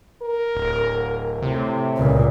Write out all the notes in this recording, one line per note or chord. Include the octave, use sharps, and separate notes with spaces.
A#4
D1
A2 C3
C#2 A#2